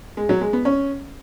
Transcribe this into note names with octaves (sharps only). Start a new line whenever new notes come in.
G#3
F#3
G#3
B3
C#4